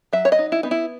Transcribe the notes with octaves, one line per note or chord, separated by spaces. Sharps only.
F#3 E5
C#5
D#5
D#4
E4
B3 D#4
E4